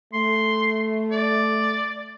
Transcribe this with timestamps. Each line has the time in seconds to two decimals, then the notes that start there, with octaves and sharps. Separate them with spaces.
0.13 A3 C6
1.11 D5